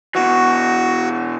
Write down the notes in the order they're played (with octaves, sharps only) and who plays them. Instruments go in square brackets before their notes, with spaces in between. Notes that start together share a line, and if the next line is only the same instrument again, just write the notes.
[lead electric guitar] B2 E3 [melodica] F#4